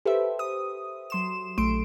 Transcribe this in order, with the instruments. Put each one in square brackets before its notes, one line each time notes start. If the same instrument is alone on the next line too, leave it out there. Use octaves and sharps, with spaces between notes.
[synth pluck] G4 A4 B4 C5 E5
D#6
F#3 C6 E7
A#1 A3 C6 D7